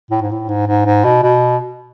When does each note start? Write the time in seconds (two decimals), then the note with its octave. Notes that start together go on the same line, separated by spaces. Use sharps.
0.10 A2
0.21 G#2
0.31 A2
0.48 G#2
0.67 G#2
0.86 G#2
1.04 B2
1.23 B2